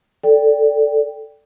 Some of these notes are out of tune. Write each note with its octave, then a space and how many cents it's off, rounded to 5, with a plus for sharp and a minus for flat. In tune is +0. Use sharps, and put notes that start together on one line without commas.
A4 +0 D5 -10 G5 +0